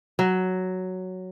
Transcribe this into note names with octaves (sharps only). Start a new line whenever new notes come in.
F#3